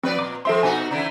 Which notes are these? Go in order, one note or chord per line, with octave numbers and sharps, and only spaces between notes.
F3 C4 B4 D5
A#2 D6
F3 C4 A4 E5 C6
B2 D#4 F#4 G#5
C#3 E3 E4